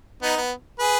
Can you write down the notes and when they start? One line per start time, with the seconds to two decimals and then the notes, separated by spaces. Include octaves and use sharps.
0.22 B3 D#4
0.37 B3
0.79 G#4 B4